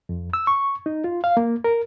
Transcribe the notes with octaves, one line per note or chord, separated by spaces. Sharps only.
F2
E6
C#6
D#4
F4
F5
A#3
A#4